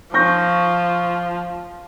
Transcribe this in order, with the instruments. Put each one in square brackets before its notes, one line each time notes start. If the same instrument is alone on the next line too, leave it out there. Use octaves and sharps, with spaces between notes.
[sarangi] F3 [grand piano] C#6 G6 A#6